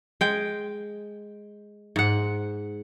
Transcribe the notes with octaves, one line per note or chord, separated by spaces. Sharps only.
G#3 G5
G#2 F#5